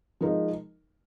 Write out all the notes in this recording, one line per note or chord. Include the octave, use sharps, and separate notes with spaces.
F3 G#3 D#4 A#4